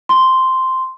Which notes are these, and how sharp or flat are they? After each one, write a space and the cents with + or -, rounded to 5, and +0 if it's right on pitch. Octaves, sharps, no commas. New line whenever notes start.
C6 -5